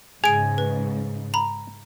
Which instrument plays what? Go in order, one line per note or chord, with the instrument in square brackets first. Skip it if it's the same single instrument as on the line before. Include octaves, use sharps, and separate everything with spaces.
[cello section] G#2 C#3 [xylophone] G#4 D7 [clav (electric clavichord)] G#5
[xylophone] B4
A#5 B5